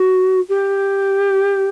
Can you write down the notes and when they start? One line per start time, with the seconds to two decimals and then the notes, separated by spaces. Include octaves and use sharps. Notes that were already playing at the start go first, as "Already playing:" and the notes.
Already playing: F#4
0.49 G4